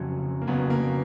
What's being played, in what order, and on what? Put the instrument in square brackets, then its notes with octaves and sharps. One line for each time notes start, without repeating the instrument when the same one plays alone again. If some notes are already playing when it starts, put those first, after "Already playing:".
Already playing: [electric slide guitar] F2 C#3 F#3
[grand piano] A#3
[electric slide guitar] F2 C#3 F#3 [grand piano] B3
[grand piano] A#3